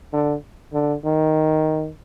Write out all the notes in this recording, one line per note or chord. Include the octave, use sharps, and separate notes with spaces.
D3
D3
D#3